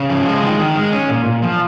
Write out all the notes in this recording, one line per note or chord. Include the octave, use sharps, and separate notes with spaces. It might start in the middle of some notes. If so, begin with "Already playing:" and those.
Already playing: C#3
F3
G#3
D#3
D#3
G#3
C#4
A#2
A#2
F3